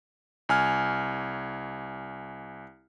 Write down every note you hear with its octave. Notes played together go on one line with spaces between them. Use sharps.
C2 G#5 F6